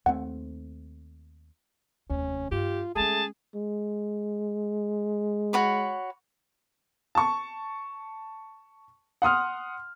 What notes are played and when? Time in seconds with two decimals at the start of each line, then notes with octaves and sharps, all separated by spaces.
0.06 D#2 A3 C4 F#5
2.10 F1 D#2 C#4
2.51 G2 F4 G4
2.96 G#3 A3 C#4 G#4 A5
3.55 G#3
5.53 F#4 C#5 B5
7.15 A5 C#6
9.22 F#5 C6 D#6 F6